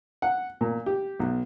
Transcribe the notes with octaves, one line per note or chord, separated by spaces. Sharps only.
F#5
A#2
G4
B1